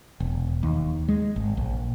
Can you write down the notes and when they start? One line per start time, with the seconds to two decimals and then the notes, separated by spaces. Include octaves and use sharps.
0.20 E1
0.63 D#2
1.08 G#3
1.36 G#1
1.57 A#1